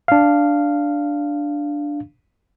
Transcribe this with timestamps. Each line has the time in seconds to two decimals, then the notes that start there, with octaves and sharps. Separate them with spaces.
0.08 D4 F5